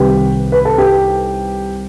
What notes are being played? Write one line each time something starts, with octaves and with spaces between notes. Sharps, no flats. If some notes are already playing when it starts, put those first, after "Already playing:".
Already playing: C2 C3 D#3 G4 B4
B4
A4
G4 B4